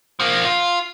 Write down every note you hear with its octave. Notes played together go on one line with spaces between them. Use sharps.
F3 A#3
F4